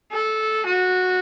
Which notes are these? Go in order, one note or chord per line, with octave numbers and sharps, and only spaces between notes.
A4
F#4